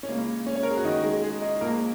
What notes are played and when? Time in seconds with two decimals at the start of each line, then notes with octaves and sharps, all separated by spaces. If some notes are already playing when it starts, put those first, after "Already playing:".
0.03 C#4
0.08 C#2 C#3 G#3 A#3
0.46 C#4
0.56 C#5
0.63 A#4
0.70 G#4
0.77 F#4
0.85 D#3 D#4
1.03 G#3 G#4
1.23 G#3 G#4
1.41 D#4 D#5
1.61 A#1 A#2 G#3 A#3 A#4